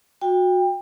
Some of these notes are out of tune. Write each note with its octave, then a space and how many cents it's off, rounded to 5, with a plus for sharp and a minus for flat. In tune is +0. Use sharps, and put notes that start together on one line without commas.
F#4 -25 G5 +25